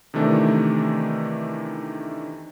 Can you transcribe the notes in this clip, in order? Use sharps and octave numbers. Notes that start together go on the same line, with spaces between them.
C3 D#3 E3 A3 D4